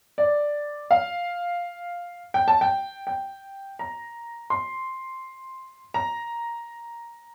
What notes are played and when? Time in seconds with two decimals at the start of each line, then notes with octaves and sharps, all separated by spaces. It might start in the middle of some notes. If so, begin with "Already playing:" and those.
0.18 D5
0.91 F5
2.34 G5
2.48 A5
2.61 G5
3.07 G5
3.79 A#5
4.50 C6
5.94 A#5